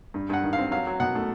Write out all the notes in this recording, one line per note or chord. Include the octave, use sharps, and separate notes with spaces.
G2
G2 F#5
D#3
F5
C4
F#3 F5
F#3
B2 F#5
A3